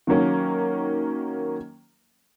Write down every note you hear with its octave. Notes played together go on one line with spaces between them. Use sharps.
D#3 F#3 A#3 C#4